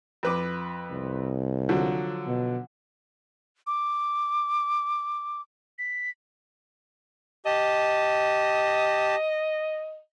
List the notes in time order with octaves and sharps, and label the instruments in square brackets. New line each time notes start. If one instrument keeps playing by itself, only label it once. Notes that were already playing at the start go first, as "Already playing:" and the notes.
[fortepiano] F2 B4 D6
[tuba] C2
[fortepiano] D3 F3 F#3
[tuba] B2
[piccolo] D6
B6
[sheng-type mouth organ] G4 A5 [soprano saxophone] D#5